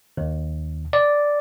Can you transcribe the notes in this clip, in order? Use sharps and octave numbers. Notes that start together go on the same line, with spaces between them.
D#2
D5